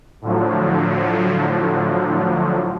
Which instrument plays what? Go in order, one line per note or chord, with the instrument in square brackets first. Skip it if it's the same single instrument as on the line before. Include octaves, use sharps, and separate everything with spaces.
[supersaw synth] A2 D3 F3 F#3